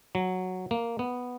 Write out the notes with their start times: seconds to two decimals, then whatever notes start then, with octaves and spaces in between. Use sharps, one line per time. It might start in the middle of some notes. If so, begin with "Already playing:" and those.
0.15 F#3
0.71 A#3
0.99 B3